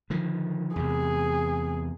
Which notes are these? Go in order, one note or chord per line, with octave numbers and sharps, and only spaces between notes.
D3 D#3 F3
E2 C3 G#4